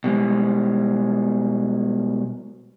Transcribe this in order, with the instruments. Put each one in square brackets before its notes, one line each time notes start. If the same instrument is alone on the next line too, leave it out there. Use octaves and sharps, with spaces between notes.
[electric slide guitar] B2 G3 G#3